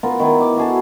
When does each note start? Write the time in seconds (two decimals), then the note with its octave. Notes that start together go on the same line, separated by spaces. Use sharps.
0.03 B3 F4 A#4
0.20 D#3 B3 E4
0.41 D6
0.57 F#4 G#4 A4